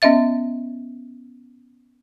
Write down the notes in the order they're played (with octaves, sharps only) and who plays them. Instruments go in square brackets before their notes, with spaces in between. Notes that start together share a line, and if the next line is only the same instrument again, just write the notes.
[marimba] B3 C#4 D#5 E5 A6